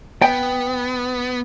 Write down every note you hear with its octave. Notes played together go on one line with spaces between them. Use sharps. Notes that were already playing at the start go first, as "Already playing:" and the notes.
B3 G5